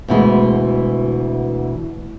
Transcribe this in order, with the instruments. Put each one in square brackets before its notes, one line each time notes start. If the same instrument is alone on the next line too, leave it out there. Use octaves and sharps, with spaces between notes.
[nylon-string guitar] D2 B2 E3 G#3